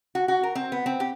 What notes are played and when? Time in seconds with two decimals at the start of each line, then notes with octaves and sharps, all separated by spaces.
0.15 F#4
0.28 F#4
0.43 A#4
0.55 C4
0.72 B3
0.86 C4
1.00 G4